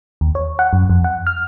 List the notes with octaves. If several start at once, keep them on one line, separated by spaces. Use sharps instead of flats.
D#2
C#5
F#5
F#2
F2
F#5
F6